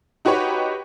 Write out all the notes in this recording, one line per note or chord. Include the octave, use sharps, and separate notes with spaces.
D#4 F#4 G4 B4 C#5